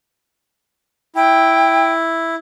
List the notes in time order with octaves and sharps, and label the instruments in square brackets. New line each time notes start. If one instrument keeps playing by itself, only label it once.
[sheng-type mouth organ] E4 [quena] G5